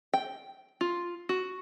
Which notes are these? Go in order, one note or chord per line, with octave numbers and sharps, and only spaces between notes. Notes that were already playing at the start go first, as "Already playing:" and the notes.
G5
F4
F#4